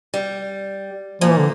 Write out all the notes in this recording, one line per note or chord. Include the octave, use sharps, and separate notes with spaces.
G3
A#2 F3 A#3
E3
D3